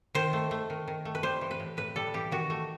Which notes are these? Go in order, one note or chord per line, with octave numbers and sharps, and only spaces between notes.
D#3 C5
A3
A3
D#3
D#3
A3
B4
G3 C5
E3
B4
A2
A2 B4
G3 A4
E3 G4
D#3 F#4
A3